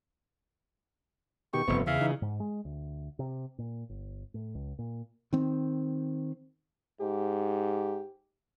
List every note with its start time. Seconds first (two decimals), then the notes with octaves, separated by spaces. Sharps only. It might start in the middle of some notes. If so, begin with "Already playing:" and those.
1.53 B2 D#3 G4 C#6
1.68 F1 G2 B3 C4
1.87 E2 C#3 E5 F5
2.01 E3 D#4
2.22 G#2
2.40 G#3
2.65 D2
3.19 C3
3.59 A#2
3.89 G1
4.34 A2
4.55 C#2
4.79 A#2
5.33 D#3 C4
7.01 G#2 G4